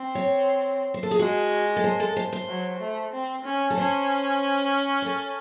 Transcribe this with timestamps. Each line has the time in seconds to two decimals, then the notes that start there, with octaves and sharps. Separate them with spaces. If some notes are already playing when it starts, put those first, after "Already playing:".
Already playing: C4
0.15 C#5
0.94 C5
1.03 A4
1.11 G#4
1.19 G#3 F#4
1.76 A4
1.84 C5
2.00 A4
2.16 C5
2.33 C5
2.49 F#3
2.81 A3
3.13 C4
3.45 C#4
3.70 A4
3.77 C#4 C5
5.02 C5
5.06 A4